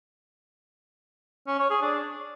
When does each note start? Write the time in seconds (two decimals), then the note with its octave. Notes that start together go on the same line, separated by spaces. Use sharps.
1.48 C#4
1.59 C#5
1.70 G#4
1.82 D4